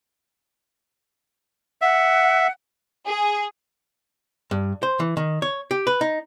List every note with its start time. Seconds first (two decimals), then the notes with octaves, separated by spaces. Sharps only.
1.81 E5 F#5
3.06 G#4
4.51 G2
4.83 C5
5.00 E3
5.17 D#3
5.42 C#5
5.71 G4
5.87 B4
6.01 D#4